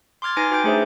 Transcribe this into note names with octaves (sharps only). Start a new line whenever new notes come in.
C6 D6 F6 G#6 A6
D#4 B4 G#5 D6 A#6 D7
F#4 B4 G5 D6 G6 D7
A3 D4 G#4 C5 D5 E5